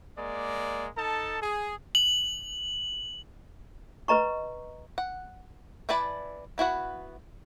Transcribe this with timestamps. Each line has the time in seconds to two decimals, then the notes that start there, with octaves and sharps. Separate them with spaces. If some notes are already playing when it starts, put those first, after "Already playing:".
0.17 G#3 A#3 D5
0.98 D#4 A4 A5
1.42 G#4
1.95 F#7
4.08 B4 D#5 A#5 C#6
4.98 F#5
5.89 E3 E4 B4 D5 A5
6.58 B3 E4 F#4 F#5